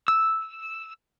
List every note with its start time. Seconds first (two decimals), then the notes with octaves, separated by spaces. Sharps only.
0.08 E6